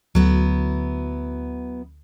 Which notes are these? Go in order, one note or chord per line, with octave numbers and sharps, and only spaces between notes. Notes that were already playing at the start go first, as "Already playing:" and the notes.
D2 F#3 B3 E4